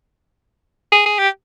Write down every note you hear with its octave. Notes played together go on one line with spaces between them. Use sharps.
G#4
G#4
G4